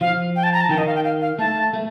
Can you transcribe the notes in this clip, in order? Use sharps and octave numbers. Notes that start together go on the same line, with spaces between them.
F3 F5
G5
A5
A#5
A5
D#3 G5
D#5
F5
G5
F5
F5
A3 A5
A3